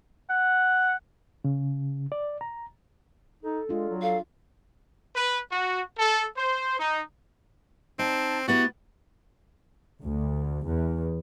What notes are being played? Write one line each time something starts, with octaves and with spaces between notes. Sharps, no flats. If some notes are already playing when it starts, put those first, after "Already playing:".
F#5
C#3
D5
A#5
D#4 A4
G#3 D4 F4
F#3
A4 F5
B4
F#4
A4
C5
D#4
C4 D#4 A5
B3 E4 F#4 G4 A6
D2
E2